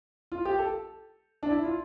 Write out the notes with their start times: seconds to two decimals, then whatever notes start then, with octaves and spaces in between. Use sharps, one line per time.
0.32 F4
0.45 G4
0.59 A4
1.43 D4
1.51 E4
1.65 F4